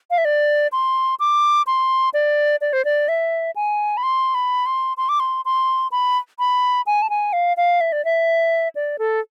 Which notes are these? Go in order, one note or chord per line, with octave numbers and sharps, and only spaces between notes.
F5
E5
D5
C6
D6
C6
D5
D5
C5
D5
E5
G#5
B5
C6
B5
C6
C6
D6
C6
C6
B5
B5
G#5
A5
G#5
F5
F5
E5
D5
E5
D5
A4